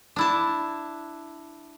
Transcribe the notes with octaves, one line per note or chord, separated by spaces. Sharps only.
D4 E4 A5